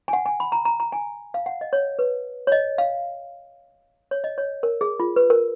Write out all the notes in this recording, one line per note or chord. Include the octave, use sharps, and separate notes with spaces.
G#5
F#5
G#5
B5
A#5
A#5
A#5
G#5
F5
F#5
D#5
C#5
B4
C#5
D#5
F5
C#5
D#5
C#5
A#4
G#4
F4
B4
A#4